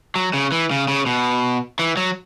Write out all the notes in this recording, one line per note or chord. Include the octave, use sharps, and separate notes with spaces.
F#3
C#3
E3
C#3
C#3
B2
E3
F#3